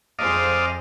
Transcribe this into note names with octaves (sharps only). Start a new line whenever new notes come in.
F2 G#4 C5 D5 D#5 F5